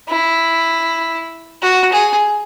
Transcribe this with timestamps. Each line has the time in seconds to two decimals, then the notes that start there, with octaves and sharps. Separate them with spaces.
0.09 E4
1.62 F#4
1.92 G#4